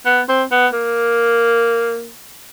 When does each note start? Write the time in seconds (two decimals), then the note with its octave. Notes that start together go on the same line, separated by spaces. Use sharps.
0.06 B3
0.29 C4
0.51 B3
0.73 A#3